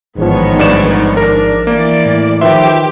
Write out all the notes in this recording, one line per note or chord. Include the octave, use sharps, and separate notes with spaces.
A1 G#2 D#3 F3 B3 C#5
G2 D5 E7
D4 A#4
E3 A#3 D5
A2
D#3 F3 G4 B4 E5 C6